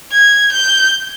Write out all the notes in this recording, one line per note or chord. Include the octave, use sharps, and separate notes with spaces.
G#6
G6